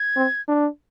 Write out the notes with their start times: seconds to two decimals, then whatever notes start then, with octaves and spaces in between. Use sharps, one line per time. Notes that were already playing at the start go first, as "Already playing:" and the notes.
Already playing: G#6
0.16 C4
0.48 D4